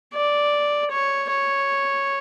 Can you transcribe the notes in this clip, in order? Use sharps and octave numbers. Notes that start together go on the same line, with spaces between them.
D5
C#5
C#5